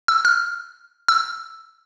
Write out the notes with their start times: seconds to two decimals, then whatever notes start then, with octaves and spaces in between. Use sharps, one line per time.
0.08 E6
0.25 F6
1.08 E6